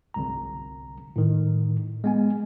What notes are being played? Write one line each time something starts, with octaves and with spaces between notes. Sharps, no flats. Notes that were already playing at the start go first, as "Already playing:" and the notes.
G1 C2 A#5
A2 D#3
G#3 B3 G#5